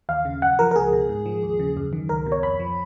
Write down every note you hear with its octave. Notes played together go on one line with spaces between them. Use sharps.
D#2 F5
C#3
F#2 F#5
F3 A#4
A#4
C#2 G#4
B2
G#2
F3
D#2
C#3
F#2
D#3
C#2 A#4
B2
C#5
F2 B5
F3